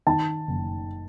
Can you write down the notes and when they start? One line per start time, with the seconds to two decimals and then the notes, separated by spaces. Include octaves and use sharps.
0.07 D#3 A5
0.48 F#1